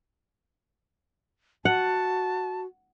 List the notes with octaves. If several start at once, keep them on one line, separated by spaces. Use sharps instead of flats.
F#4 F#5 A5